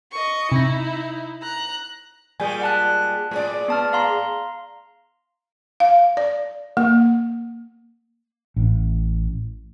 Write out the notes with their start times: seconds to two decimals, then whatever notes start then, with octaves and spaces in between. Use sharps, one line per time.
0.12 D#5 C#6
0.52 C3 D#4 E4 A#6
1.42 A#5 F#6
2.40 A#2 G3 G#3 G#5 G6
2.61 F#5 A5 F#6
3.31 A2 G#3 D5
3.68 B3 A5 F6
3.93 F5 A#5 C6
5.80 F5
6.17 D5
6.77 A#3
8.56 A1